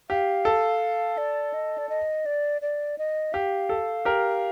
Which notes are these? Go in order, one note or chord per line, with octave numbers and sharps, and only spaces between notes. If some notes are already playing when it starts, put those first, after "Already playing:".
G4 F5
A4
D5
D#5
D5
D#5
D5
D5
D#5
G4 F5
A4
G4 A#4